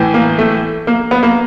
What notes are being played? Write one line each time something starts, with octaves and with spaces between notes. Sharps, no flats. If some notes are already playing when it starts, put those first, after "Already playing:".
Already playing: A2 E3
A#3
A3
A#3
B3
A#3